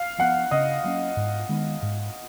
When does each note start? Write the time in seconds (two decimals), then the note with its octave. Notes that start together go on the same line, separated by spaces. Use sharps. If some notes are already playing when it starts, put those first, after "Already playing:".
Already playing: F5
0.18 F3 B3 F#5
0.51 C#3 D#5
0.84 F#3 A#3 C#4
1.17 G#2
1.49 D#3 G#3 B3
1.83 G#2